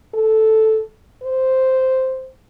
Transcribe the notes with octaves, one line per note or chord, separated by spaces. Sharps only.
A4
C5